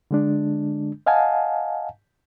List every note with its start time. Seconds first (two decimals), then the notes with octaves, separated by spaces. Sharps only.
0.11 D3 G#3 D4
1.06 D#5 F5 F#5 G#5 A5